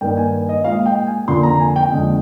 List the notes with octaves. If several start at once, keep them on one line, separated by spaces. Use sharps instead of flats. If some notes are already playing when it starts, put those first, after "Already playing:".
G2 D#3 A#3 G5
G#5
D#5
A#2 G#3 F5
G5
G#5
F2 D3 F3 A#3 C6
A#5
G#5
G5
F2 D3 G#3